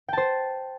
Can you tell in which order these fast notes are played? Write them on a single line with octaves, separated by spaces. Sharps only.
G5 A5 C5